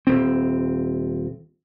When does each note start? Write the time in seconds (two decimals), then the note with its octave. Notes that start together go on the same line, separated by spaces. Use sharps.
0.07 D#1 C4